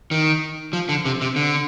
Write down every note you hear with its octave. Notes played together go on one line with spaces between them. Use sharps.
D#3
F3
D3
C3
C3
D3